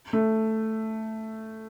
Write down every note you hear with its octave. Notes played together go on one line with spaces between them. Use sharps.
A3